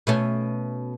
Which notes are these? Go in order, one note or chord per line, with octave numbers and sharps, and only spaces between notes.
B2 A3 C#4